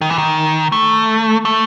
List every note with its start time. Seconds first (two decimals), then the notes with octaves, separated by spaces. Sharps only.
0.01 D#3
0.10 E3
0.18 D#3
0.72 A3
1.45 A3